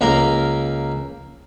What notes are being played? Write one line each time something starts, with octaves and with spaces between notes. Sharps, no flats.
C#2 A#3 A#4